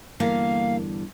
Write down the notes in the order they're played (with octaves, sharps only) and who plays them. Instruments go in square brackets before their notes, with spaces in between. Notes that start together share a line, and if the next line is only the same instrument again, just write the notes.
[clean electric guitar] E2 G2 D3 [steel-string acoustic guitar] A#3 [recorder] F5